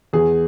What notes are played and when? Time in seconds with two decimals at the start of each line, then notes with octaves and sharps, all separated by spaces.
0.13 E2 G#4